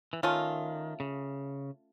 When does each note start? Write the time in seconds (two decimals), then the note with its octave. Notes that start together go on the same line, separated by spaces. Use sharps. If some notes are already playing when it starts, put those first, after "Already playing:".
0.13 E3
0.23 D#3 A3 C#4 F4
1.00 C#3